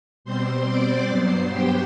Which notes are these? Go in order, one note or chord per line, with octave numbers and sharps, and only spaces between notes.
B2 G3 C4 C5 C6
D5 D6
G2 F#3 B3 C5 C6
G4 G5